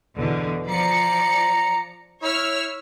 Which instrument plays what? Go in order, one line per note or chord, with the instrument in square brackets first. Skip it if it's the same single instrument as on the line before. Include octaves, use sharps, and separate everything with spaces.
[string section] E2 B2 D3
[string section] F3 D5 C#7 [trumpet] A#5
[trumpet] E4 [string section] C#5 E6 F6